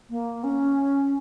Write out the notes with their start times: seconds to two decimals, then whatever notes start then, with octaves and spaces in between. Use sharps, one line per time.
0.10 A#3
0.44 C#4